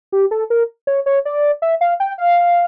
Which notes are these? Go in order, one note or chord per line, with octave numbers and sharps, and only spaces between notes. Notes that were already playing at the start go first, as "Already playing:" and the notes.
G4
A4
A#4
C#5
C#5
D5
E5
F5
G5
F5